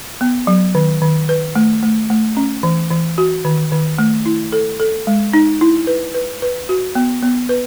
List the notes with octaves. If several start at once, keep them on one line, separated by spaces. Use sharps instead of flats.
B3
F#3
D#3
D#3
B4
A3
A3
A3
C#4
E3
E3
F#4
D#3
D#3
A3
E4
A4
A4
G#3
D#4
E4
B4
B4
B4
F#4
B3
B3
B4